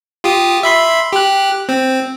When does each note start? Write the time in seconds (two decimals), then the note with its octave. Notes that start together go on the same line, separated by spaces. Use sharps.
0.24 F4 G4 D#6
0.63 E5 B5 C6
1.13 G4 F#6
1.69 C4